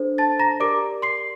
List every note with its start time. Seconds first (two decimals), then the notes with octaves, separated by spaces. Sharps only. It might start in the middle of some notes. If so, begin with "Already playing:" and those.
Already playing: D4 A4 C5
0.18 A5 A6
0.40 A#5 A#6
0.60 G4 A#4 D5 D6 D7
1.02 C6 C7